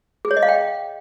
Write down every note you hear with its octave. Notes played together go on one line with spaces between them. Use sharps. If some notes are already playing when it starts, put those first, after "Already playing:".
G#4
C#5
D#5
F5
G5